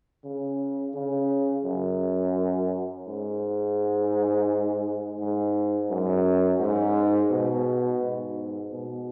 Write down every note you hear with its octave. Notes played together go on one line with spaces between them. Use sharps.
C#3
C#3
F#2
G#2
G#2
F#2
G#2
B2
G#2
B2